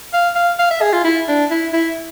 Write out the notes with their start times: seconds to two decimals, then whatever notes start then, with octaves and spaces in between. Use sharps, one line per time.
0.13 F5
0.35 F5
0.59 F5
0.71 E5
0.81 G#4
0.93 F4
1.04 E4
1.28 D4
1.51 E4
1.73 E4